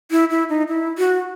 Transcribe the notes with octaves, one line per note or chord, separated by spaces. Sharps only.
E4
E4
D#4
E4
F#4